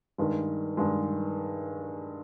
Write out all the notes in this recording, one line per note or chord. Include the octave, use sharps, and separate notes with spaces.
G2 D#3 G#3
G2 D#3 G#3